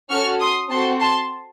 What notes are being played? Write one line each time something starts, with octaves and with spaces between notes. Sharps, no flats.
C#4 F#4 A4 C#6 F6
C6 D#6
C4 F#4 A4 A5 C6
A5 C6